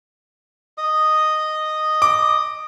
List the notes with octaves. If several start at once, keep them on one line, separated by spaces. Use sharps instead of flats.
D#5 D#6
D6